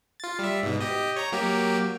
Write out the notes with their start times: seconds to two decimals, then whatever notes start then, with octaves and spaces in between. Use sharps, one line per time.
0.20 F4 A6
0.39 G3 E5
0.63 G#2 B2
0.80 G4 D#5
1.16 C#5 A#5
1.32 F#3 A#3 G4